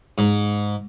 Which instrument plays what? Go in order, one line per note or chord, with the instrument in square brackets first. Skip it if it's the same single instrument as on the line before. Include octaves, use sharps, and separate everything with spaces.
[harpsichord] G#2